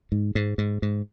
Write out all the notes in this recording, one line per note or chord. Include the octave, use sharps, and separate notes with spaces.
G#2
G#2
G#2
G#2